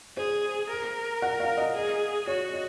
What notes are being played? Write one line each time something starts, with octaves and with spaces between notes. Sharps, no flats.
G#4 C5
A#4
F#5
F5
D#5
G#4
F#4 C#5
D#5